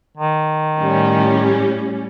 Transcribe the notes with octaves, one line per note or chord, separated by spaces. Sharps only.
D#3
A2 G3 C#4